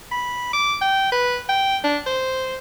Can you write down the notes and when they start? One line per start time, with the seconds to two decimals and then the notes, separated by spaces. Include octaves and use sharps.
0.11 B5
0.53 D6
0.81 G5
1.12 B4
1.49 G5
1.84 D4
2.06 C5